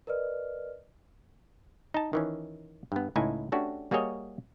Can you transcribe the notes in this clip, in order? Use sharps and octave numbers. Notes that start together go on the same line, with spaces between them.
A#4 B4 D5 D#5 F6
D#4 A5
D#3 E3 C#4
G2 B3
C#2 A2 D#4 E4 G#5
A3 C#4 D4 F#4 G4
G3 A#3 F#4 G#4 C#5 D#5